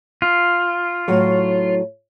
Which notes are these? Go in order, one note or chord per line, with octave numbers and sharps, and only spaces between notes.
F4
A2 F#3 C#5